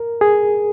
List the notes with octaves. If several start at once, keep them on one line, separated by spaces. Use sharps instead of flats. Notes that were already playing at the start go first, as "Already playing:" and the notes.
Already playing: A#4
G#4